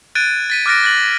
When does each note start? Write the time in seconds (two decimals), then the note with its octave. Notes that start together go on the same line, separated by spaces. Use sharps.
0.15 F#6 G#6 A6 D7 D#7
0.50 A6 B6 D#7
0.66 D6 F6 F#6 A6 A#6 D7
0.84 F#6 A6 A#6 F#7